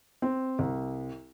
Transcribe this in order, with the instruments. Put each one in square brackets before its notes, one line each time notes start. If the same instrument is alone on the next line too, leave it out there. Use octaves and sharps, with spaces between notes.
[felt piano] C4
C2